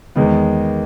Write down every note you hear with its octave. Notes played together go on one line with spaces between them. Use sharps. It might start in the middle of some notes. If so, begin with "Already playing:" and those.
E2 D#3 G#3 B3